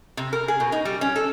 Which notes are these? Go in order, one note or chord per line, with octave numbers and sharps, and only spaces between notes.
C3
A#4
G#4
B2
D#4
G3
C#4
A4